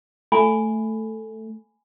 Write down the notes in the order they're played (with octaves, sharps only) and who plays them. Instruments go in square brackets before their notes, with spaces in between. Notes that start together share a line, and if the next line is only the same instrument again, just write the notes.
[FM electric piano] A3 [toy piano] G#5 B5